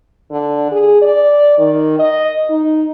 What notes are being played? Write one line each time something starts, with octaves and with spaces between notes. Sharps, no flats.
D3
G#4
D5
D#3
D#5
D#4